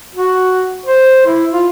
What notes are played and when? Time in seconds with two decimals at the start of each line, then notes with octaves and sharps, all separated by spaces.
0.15 F#4
0.86 C5
1.27 E4
1.53 F4